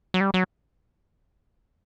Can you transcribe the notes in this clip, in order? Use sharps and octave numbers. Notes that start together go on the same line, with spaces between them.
F#3
G3
F#3